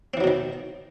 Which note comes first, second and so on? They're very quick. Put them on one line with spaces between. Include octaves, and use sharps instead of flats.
C4 E3 F#3 B2 D#3